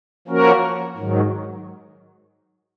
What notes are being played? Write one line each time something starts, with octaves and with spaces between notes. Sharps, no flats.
F3 A#3 C#4 F#4 A#4
G#2 D#3 F#3